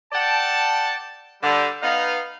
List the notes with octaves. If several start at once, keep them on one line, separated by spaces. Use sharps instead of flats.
A4 D5 F#5 G5 A5
D3 G3
B3 D#4 F5